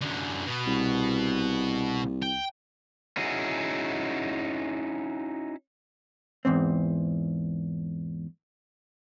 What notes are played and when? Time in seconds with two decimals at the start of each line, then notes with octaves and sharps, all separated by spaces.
0.01 F#2 D3
0.46 B2 B3
0.66 C2
2.22 G5
3.17 C#4 D#4 E4 F#4 G#4
6.45 E2 G#2 C4